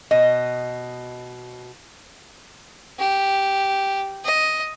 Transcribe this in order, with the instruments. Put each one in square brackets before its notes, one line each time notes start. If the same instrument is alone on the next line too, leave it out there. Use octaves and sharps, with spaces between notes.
[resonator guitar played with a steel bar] B2 D#5
[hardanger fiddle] G4
D#5